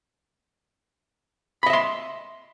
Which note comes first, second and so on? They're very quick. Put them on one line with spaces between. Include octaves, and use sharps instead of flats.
B5 D#5 E5 C6